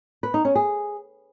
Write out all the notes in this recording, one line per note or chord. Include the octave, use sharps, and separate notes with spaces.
B4
D#4
C#4
G#4